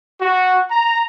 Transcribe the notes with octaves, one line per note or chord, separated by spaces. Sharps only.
F#4
A#5